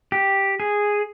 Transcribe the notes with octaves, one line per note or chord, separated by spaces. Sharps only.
G4
G#4